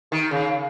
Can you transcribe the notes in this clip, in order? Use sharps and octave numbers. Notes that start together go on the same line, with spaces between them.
D#3
C#3